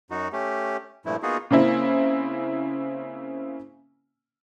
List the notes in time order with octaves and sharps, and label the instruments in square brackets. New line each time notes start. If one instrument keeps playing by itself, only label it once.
[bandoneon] F#2 D#4 F#4
A3 C#4 G4
G2 A#2 F3 A3 E4
A#3 B3 D#4 F4 F#4 G#4
[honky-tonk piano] C#3 A#3 C4 E4